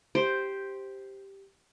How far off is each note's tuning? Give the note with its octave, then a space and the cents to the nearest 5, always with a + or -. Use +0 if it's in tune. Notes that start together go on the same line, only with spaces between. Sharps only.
G4 +0 C5 +0